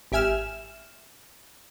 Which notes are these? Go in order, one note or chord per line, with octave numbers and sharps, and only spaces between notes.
G#1 G4 E5 G#5 F6 E7